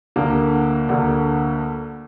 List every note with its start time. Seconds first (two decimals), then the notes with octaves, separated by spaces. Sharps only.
0.16 D2 D3 A#3
0.89 D2 D3 A#3